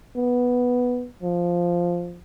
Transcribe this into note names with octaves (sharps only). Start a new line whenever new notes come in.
B3
F3